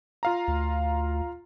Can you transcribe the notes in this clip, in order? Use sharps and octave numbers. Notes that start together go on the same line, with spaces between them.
F4 F5 A#5
D2